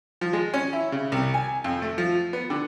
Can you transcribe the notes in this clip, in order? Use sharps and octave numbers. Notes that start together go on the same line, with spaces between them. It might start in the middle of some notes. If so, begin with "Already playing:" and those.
F3
G#3
C#4
E4
C#3
C2
G#5
F2
A3
F3
B3
D3